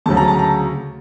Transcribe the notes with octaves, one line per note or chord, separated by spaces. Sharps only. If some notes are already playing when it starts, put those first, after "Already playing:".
D2 C#3 F#3 A5
A#5
A5
A#5